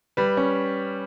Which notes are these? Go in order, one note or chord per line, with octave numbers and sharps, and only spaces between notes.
G3 B4
C#4